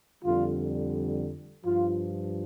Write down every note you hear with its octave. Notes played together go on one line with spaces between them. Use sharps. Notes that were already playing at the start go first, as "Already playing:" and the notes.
F2 D3 G3 F4
G2 F3 F4